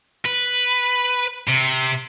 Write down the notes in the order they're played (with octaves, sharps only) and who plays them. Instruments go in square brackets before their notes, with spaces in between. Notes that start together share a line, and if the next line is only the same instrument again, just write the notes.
[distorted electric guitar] B4
C3